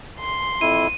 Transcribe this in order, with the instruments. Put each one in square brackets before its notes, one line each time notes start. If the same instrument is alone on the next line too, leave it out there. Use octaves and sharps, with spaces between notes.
[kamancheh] C6
[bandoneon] F2 E4 [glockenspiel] D#7